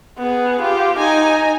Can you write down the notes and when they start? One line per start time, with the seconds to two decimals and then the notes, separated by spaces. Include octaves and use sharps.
0.18 B3 G#4
0.61 F4 G4
0.98 D#4 G#5